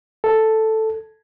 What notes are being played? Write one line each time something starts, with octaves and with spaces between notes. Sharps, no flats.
A4